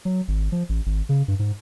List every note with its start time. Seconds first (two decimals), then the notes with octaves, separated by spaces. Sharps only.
0.05 F#3
0.28 G#1
0.52 F3
0.69 A1
0.86 G#1
1.09 C#3
1.28 G2
1.39 G#2